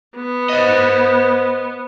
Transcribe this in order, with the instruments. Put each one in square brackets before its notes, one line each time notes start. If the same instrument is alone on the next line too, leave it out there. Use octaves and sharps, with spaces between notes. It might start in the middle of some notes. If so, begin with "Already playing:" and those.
[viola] B3
[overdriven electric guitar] C5 D#5